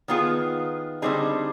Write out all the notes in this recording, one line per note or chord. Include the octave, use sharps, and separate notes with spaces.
D#3 B3 F4 G#4
D3 G3 C4 D#4 G#4